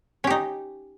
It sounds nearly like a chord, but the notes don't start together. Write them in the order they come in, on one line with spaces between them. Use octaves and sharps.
C#4 G4 D#4